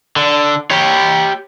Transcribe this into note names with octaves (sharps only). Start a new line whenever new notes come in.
D3
G4 C#5